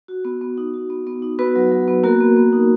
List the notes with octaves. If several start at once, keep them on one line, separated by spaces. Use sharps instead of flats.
F#4
B3
B3
D#4
F#4
B3
B3
D#4
B3 F#4 B4
F#3
F#3
B3
A#3 F#4 A#4
B3
B3
D#4